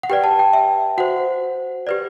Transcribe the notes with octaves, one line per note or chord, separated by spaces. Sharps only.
F#5
G4 B4 D5 G5
A5
G5
E5
F#4 C5 F#5
G4 B4 D5